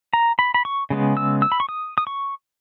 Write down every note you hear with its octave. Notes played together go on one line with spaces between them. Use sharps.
A#5
B5
B5
C#6
C#3 G#3 B3
E6
E6
B5
C#6
D#6
D#6
C#6